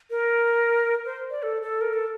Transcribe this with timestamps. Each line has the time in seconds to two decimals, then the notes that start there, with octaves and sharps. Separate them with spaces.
0.10 A#4
1.05 C5
1.30 D5
1.43 A4
1.62 A4
1.81 A#4
1.93 A4